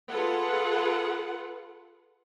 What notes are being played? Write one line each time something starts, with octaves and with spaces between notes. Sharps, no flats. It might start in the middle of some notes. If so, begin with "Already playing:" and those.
F4 G#4 A4 B4 F#5